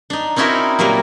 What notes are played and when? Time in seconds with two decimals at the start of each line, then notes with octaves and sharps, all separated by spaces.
0.10 D4 D#4
0.36 C4 C#4 D#4 E4 F#4 A#4
0.79 A#2 F#3 G3 A#3 A#4